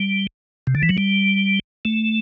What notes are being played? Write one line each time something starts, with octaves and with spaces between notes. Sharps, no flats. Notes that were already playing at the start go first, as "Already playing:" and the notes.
Already playing: G3
C3
D3
E3
F#3
G3
A3